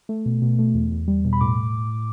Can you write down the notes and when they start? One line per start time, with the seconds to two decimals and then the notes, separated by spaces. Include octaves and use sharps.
0.09 A3
0.26 B2
0.42 B2
0.59 A3
0.74 E2
0.92 E2
1.08 G3
1.25 B2
1.33 B5
1.41 A2 D6